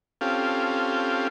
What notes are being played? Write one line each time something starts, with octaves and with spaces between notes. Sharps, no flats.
C4 C#4 F4 G4 A4 F5